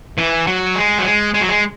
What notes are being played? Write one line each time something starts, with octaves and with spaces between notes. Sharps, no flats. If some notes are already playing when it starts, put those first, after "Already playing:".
E3
F#3
G#3
F#3
G#3
G#3
F#3
G#3